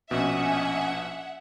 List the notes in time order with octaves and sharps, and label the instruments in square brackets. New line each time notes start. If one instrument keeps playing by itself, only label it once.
[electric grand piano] A#1 B2 [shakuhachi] C#4 [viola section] D#5 G#5 [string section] E5 F#5